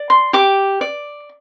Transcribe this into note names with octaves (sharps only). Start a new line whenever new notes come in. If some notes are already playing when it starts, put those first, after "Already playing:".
Already playing: D5
C6
G4 D6
D5